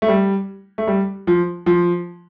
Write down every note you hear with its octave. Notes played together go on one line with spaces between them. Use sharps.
A3
G3
A3
G3
F3
F3